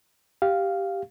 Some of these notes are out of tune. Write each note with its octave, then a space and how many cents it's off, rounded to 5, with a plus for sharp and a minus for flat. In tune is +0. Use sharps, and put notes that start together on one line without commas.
G4 +0 F5 +0